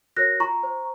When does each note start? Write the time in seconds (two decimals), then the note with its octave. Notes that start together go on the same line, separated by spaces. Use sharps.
0.17 F#4 A#4 C#5 F#6 A#6
0.40 F4 A#5 C#6
0.63 C5